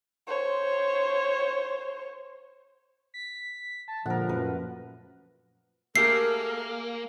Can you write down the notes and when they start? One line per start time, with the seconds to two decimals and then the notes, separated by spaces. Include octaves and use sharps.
0.27 C5 C#5
3.14 B6
3.88 A5
4.06 A#2 D3 F3 G#3 A#4 F#5
4.29 F#2 A3 B4 F#5
5.96 A3 A#3 G4 G#4 A#4 C7